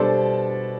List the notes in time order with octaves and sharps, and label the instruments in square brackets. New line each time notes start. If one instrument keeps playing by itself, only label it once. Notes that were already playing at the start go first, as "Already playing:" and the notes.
Already playing: [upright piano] B2 G3 D4 A4 C5